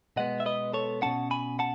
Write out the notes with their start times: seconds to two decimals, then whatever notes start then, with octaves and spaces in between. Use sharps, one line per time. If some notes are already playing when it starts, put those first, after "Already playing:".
0.16 B2 G#3 B3 D#5 F#5
0.40 E5
0.46 B4 D#5
0.73 A4 C#5
1.02 B2 A3 C#4 F#5 A5
1.31 G#5 B5
1.59 F#5 A5